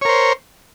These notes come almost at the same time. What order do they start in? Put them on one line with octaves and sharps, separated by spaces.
C#5 A#4 C5